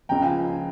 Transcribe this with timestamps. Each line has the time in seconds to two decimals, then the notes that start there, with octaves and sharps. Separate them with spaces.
0.09 C#2 C#3 F3 G5 A#5
0.22 F5 G#5